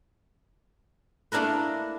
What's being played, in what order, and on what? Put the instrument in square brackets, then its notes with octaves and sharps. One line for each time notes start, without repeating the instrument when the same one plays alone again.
[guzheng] A3 A#3 D4 E4 A#4 B4